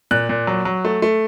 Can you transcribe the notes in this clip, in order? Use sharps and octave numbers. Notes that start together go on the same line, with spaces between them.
A#2 F#6
A#2
F#3
F#3
A3
A3